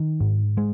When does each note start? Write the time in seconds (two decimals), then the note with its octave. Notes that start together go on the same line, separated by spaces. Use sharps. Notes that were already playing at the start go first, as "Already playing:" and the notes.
Already playing: D#3
0.21 G#2
0.57 G#3